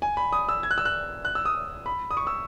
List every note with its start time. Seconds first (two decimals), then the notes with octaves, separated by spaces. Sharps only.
0.02 G#5
0.17 B5
0.32 D#6
0.49 E6
0.63 G#6
0.71 F#6
0.78 E6
0.85 F#6
1.25 F#6
1.35 E6
1.45 D#6
1.86 B5
2.11 D#6
2.17 C#6
2.27 E6